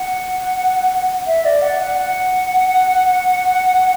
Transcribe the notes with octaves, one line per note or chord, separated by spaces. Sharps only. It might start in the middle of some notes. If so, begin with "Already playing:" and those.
Already playing: F#5
E5
D5
F#5
F#5
F#5